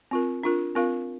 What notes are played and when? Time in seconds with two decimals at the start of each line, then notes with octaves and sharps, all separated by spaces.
0.11 C4 F4 A#4
0.43 D4 F4 A#4
0.75 C4 F4 A#4 F5